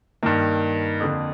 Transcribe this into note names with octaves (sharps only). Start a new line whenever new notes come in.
G2 D#3 A#3
F2 D3